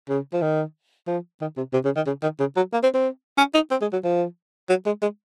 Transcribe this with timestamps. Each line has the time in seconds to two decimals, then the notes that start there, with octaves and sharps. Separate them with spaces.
0.09 C#3
0.34 F3
0.42 D#3
1.07 F3
1.42 D#3
1.57 C3
1.73 C3
1.85 C#3
1.96 D#3
2.07 C#3
2.23 D#3
2.40 C#3
2.57 F#3
2.73 A#3
2.83 C4
2.95 C4
3.38 C#4
3.54 D#4
3.71 C4
3.82 G#3
3.93 F#3
4.04 F3
4.69 F#3
4.86 G#3
5.02 G#3